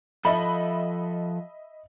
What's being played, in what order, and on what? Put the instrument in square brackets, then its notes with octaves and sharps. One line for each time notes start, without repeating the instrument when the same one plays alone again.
[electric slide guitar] F3 A4 [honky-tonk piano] D#5 E5 B5